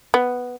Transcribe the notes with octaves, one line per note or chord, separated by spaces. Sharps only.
B3